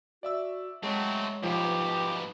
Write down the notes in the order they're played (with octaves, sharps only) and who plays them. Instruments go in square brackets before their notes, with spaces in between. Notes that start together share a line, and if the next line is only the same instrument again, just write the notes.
[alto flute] F#4 [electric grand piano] D5 E5 E6
[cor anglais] F#3 [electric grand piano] G#3 [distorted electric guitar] A3 C4 [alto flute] C#5
[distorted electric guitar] G#2 B2 [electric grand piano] F3 [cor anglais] G4
[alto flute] B4